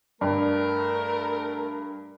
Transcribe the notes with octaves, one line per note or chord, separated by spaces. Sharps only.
G2 A3 A#4